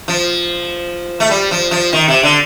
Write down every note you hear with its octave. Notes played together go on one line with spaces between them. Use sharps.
F3
A3
G3
F3
F3
D#3
C3
D3